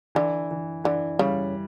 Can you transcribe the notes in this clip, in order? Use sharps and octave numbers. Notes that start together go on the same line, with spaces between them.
D3 E3
E3
D3 E3
C#3 G3